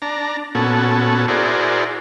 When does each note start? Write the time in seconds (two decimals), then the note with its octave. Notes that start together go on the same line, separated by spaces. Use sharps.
0.02 D4 A#5
0.55 A#2 B3 C#4 F#4 A4
1.28 E4 F#4 G#4 A#4 C5 D5